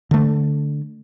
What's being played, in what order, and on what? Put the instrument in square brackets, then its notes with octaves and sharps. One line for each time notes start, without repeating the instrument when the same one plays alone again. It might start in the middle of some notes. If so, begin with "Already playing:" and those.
[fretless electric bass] D3 A3